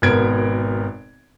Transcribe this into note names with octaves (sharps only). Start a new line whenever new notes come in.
G#1 B2 B3 A#4 G#6 D7